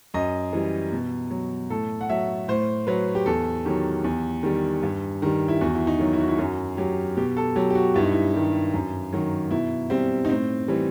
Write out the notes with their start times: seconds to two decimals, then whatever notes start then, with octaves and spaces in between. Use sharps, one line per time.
0.14 F#2 D#5
0.53 E3 G3
0.92 B2
1.31 F#3
1.70 A2 A4
2.01 F#5
2.09 F#3 E5
2.48 A2 C5
2.87 F#3 B4
3.15 G4
3.26 E2 A4
3.65 D#3 F#3 G4
4.04 E2
4.43 D#3 G3
4.83 G2
5.22 D#3 G3
5.48 E4
5.61 E2 F#4
5.75 E4
5.87 D#4
5.99 D#3 F#3
6.13 E4
6.21 F#4
6.28 E4
6.38 F#2 F#4
6.77 F#3 G4
7.17 B2 G4
7.37 A4
7.55 F#3 G4
7.70 G4
7.75 F#4
7.94 G2 E4
8.03 D#4
8.11 E4
8.34 D#3 G3
8.74 F#2
9.13 D#3 F#3
9.51 B2 E4
9.90 G3 C4
10.25 D#4
10.29 A2 C4
10.68 E3 G3